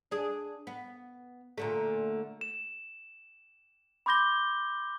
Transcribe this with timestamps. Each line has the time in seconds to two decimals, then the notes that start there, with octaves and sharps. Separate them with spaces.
0.11 D4 G#4
0.67 B3
1.58 A#2 D3 A3
2.41 E7
4.06 B5 C6 D6 G6 A#6 G7